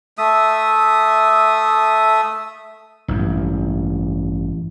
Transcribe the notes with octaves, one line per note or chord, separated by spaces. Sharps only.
A3 E5 D#6
A1 G2